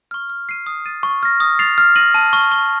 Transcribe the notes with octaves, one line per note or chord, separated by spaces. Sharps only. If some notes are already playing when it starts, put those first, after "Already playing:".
C#6 F6
F6
C7 D#7
D#6
A6 D#7
C#6
F6 A#6
D#6
A6 C7 F7
F6
A#6 D#7 F#7
A5
C#6 F6
C#6